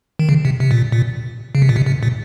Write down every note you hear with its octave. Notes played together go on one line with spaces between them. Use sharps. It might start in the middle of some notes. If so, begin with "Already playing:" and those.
D#3
C#3
C3
C3
A#2
A#2
C#3
C3
A#2
C3
C3
A#2